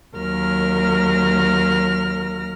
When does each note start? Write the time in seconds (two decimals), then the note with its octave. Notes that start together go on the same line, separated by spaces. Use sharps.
0.17 D#2 F#3 A#4 F6 A#6